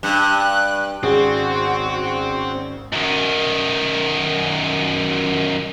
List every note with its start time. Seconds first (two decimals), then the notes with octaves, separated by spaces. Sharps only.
0.03 G2 F#6
1.03 G#1 C#3 C4 F#4 G#4 D5
2.93 F#2 D#3